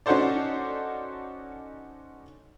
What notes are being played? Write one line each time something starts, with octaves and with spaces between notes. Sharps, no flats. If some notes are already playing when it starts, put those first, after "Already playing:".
C#4 D#4 F#4 A4 C5 D5